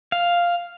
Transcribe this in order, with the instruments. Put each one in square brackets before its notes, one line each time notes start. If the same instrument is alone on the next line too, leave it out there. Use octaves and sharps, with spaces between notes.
[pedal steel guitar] F5